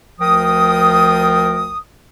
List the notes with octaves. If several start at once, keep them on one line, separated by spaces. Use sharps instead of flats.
D2 F3 A#4 G5 D#6